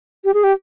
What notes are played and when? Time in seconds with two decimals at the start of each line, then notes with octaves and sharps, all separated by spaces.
0.25 G4
0.34 G#4
0.44 G4